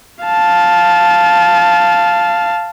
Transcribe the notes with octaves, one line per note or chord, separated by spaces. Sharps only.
F5 A5